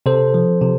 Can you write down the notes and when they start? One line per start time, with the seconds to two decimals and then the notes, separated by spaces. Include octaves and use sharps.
0.06 C3 A4 C5
0.34 F3
0.61 C3